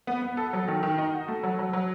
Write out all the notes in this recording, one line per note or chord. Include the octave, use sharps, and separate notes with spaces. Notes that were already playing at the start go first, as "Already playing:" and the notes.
B3
B3
A4
F#3
D#3
D#3
D#4
F#4
A3
F#3
F#3
F#3